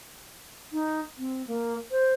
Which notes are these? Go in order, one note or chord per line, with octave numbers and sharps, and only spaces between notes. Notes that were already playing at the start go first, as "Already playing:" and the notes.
D#4
C4
A#3
C5